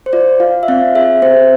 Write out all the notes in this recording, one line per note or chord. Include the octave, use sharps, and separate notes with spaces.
C5
F4 D5
F4 F5
E5
C4 F5
G#4 E5
C4 C5